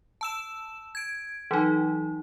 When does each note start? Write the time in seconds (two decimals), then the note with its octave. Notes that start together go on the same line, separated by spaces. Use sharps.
0.21 A5 E6 E7
0.95 G#6 D7
1.51 E3 F#3 D#4